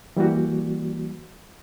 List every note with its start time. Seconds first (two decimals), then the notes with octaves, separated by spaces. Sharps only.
0.17 E3 G3 A#3 F#4